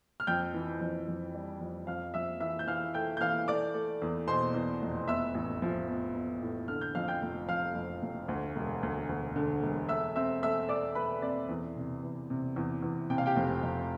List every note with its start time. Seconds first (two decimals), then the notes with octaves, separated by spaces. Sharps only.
0.20 F6
0.27 F2 G5 G6
0.54 E3
0.81 F2
1.08 F2
1.34 G3
1.61 F2
1.87 F2 F5 F6
2.14 F2 E5 E6
2.40 E3 E5 E6
2.59 G6
2.67 E3 F5 F6
2.94 A3 G5 G6
3.17 G6
3.21 E3 F5 F6
3.47 A3 D5 D6
3.74 A3
4.02 E2
4.28 B2 C5 C6
4.54 E2
4.82 F1
5.08 B3 E5 E6
5.34 A1
5.62 F3
5.88 B3
6.14 B3
6.42 A2
6.68 D3 F6
6.81 G6
6.95 F2 F5 F6
7.08 G5 G6
7.22 F1
7.49 F2 F5 F6
7.75 F2
8.02 F1
8.28 D2
8.56 E1
8.83 D2
9.09 D2
9.36 D3
9.63 E1
9.89 A3 E5 E6
10.16 C4 E5 E6
10.42 A3 E5 E6
10.69 A3 D5 D6
10.95 A3 B4 B5
11.22 C4 D5
11.49 E2
11.76 C3
12.03 E2
12.30 C3
12.56 E2
12.82 E2
13.10 C3 G5
13.18 F5
13.26 G4 G5
13.36 F1
13.63 F1